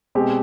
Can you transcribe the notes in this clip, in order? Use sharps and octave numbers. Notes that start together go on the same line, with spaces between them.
B2 G#3 C4 G4